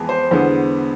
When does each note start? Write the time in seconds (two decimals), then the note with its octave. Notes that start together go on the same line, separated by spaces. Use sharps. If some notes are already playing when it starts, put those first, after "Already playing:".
Already playing: F2 E3 G#3 B3
0.09 C5
0.31 E2 D3 G#3 B3 C5